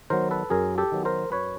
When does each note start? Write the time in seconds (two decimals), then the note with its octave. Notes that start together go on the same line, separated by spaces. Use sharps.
0.10 D#3 F#3 B3 A#4 C5
0.31 A4 B4
0.50 F#2 G#4 A#4
0.78 G4 A4
0.92 D#3 F#3 B3
1.05 A#4 C5
1.32 F#2 B4 C#5